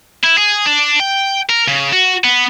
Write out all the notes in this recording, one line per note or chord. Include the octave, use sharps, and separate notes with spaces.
E4
G#4
D4
G5
A#4
C#3
F#4
B3